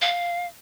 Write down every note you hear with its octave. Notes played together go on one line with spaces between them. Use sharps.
F5